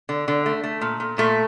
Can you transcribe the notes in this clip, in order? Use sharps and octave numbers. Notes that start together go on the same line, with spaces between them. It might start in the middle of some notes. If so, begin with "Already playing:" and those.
D3
D3
A3
A3
A#2
A#2
A#2 A3